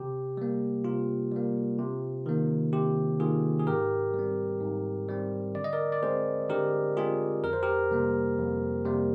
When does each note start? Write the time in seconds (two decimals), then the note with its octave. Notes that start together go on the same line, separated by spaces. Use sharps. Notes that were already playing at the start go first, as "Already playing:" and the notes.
Already playing: C3 G4
0.37 G3 A#3
0.84 C3 F4
1.32 G3 A#3
1.79 C3
2.26 D#3 A#3
2.73 C3 G4
3.20 D#3 A#3 F4 G#4
3.59 G#4
3.67 G#2 G4 A#4
4.14 G3
4.19 C4
4.61 G#2
5.08 G3 C4
5.55 D3 D5
5.64 D#5
5.73 A#4 D5
5.92 D5
6.03 G#3 C4 G#4 C5
6.49 D3 G4 A#4
6.97 G#3 C4 F4 G#4
7.44 F2 A#4
7.53 C5
7.63 G4 A#4
7.91 C3 G3 A#3
8.38 F2
8.85 C3 G3 A#3